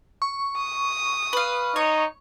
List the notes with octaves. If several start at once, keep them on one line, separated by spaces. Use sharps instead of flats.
C#6
D#6
B4 F5
D#4 C#5